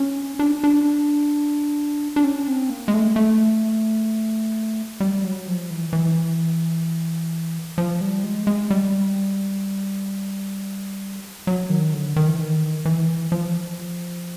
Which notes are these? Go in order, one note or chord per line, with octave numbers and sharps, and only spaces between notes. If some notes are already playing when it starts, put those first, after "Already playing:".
Already playing: C#4
D4
D4
D4
C#4
C4
A#3
G#3
A3
A3
G3
F#3
F3
E3
E3
F3
G3
G#3
G#3
G3
F#3
D#3
D3
D#3
E3
D#3
E3
F3